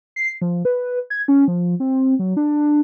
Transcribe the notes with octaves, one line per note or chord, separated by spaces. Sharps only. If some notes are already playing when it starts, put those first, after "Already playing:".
C7
F3
B4
G#6
C#4
F3
C4
F#3
D4